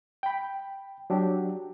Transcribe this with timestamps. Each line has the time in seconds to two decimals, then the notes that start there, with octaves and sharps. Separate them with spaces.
0.23 G5 B5
1.10 F#3 D4 G4